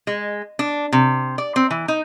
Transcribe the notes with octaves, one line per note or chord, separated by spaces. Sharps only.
G#3
D4
C3
D5
C4
E3
D#4